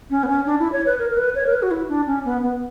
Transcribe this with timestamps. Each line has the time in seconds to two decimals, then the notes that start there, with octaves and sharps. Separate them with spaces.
0.10 C#4
0.23 B3
0.28 C#4
0.46 D4
0.59 E4
0.72 C#5
0.86 B4
0.99 A#4
1.10 A#4
1.18 B4
1.35 C#5
1.46 A#4
1.53 B4
1.62 F#4
1.71 E4
1.89 D4
2.07 C#4
2.25 B3
2.43 B3